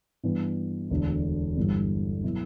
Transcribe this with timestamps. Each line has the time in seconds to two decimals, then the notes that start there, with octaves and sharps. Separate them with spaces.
0.23 G2 E3 B3
0.90 E1 D2 D3
1.56 G1 G2 E3 G3
2.23 B2 F#3 B3 E4